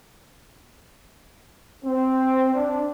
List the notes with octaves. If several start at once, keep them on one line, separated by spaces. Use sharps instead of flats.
C4
D4